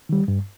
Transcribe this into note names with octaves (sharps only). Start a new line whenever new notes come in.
D#3 G3
G2